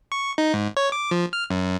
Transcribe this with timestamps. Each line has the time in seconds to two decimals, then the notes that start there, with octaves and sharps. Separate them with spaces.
0.12 C#6
0.38 D#4
0.54 G#2
0.77 C#5
0.92 D6
1.11 F3
1.33 F6
1.50 F#2